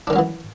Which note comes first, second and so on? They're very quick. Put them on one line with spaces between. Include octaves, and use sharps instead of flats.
D4 D#3 C#4 F#3 E3